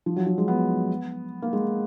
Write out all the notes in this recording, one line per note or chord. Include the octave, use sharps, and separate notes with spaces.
F3
F#3
F#3
G#3
B3
A#3
G#3